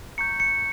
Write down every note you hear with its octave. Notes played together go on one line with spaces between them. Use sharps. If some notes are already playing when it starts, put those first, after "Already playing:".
A#5 C#6 G6 C#7
C#7